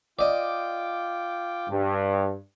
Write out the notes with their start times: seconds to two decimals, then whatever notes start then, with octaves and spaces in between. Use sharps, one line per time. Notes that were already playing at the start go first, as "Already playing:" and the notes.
0.19 F4 D5 D#5 G5 D6
1.69 G2